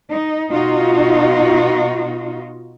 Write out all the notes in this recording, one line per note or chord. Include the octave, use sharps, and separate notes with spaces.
D#4
B2 D#4 F4 F#4